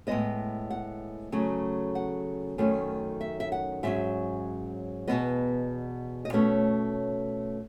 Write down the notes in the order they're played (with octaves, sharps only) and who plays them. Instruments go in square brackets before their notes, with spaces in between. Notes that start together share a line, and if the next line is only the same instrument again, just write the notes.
[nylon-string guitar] A2 G#3 B3 D#5
F#5
C#3 F#3 A3 C#4
F#5
F#2 D#3 A3 C#4
E5
E5
F#5
G#2 F#3 C#4 E5
E2 B2 G#3 B3 D#5
D#5
B2 A3 C#4 C#5